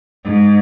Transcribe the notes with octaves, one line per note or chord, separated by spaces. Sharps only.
G#2